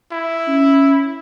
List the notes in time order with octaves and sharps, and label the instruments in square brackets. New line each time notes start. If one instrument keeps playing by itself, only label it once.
[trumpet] E4
[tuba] C#4